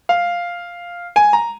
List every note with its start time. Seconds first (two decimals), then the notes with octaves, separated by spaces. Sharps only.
0.09 F5
1.16 G#5
1.33 A#5